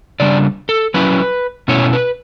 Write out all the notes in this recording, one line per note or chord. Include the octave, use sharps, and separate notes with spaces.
C#3 G3 D4 D5
A4
F#3 C#4 E4 B4
B2 A3 C#4 E4 C#5
B4